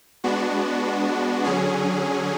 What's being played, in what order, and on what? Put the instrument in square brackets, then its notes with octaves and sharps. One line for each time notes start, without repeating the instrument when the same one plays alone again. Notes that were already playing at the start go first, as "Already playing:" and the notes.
[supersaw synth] G#3 B3 D4 F#4
D3 F#3 C#4 G#4